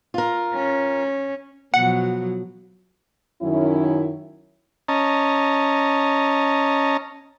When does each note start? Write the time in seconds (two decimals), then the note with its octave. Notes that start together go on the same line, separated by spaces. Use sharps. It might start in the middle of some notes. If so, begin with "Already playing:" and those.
0.14 F4 A#4
0.54 C#4
1.74 B2 F3 F#3 F#5
3.42 F#2 D#3 F#3 C#4 E4
4.88 C#4 D#5 A5 A#5